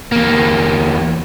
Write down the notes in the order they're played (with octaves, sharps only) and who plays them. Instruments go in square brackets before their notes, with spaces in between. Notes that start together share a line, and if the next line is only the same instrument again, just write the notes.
[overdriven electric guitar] E2 A#3